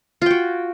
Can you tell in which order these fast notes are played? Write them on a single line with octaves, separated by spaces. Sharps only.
F4 G5 F#4